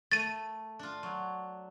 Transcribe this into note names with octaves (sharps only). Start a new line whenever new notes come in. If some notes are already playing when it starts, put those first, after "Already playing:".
A3 A6 D#7
D4 F4
F#3